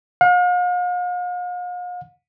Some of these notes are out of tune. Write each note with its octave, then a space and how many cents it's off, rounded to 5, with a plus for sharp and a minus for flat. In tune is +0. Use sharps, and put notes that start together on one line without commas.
F5 +45